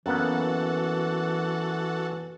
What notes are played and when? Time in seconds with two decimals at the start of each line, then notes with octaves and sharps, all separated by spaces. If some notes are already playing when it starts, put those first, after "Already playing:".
0.06 F#2 E3 A#3 B3 F#4 A4